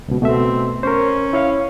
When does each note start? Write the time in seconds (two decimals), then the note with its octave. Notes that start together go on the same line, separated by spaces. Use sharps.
0.08 C#2 B2
0.22 B2 A3 C4 E5
0.83 C#4 A#4 C5
1.33 E4 C#5 F5